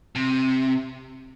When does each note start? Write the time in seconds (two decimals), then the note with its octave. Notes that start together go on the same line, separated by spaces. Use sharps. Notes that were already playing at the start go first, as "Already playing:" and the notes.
0.15 C3